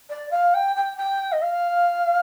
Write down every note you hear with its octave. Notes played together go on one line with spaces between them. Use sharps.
D5
F5
G5
G5
G5
D#5
F5